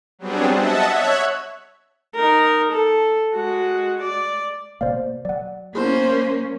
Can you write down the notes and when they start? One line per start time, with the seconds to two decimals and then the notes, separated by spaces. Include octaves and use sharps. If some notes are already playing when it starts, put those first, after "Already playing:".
0.19 F#3 G3 B3 C4 D4 G#4
0.50 D#5 E5 F#5 A5
0.87 C#5 E5 F#6 G#6
2.15 D#4 A#4
2.72 A4
3.35 G#3 F#4
4.01 D5
4.81 B2 A#3 C5 D5 F5
5.25 F#3 D5 F#5
5.75 A#3 B3 C#4 E4 G#4 C5